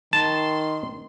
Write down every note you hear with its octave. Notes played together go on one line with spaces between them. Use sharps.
D#3 A5 C6